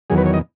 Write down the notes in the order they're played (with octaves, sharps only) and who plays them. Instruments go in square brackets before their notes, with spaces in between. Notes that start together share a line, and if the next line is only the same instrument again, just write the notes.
[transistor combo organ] E2 D#3 F#3 G#4
B4
C#5
D#5